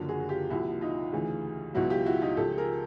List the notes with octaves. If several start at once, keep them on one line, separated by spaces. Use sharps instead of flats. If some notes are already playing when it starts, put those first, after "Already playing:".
Already playing: F#1 F#2 D3 F3
F#4 G#4
F#4
F4 G4
C2 A#2 F3 E4 F#4
D#4 F4
D2 C#3 E3
C#2 B2 F#3 E4 F#4
F4 G4
E4 F#4
D#4 F4
C#2 C#3 F3 G4 A4
G#4 A#4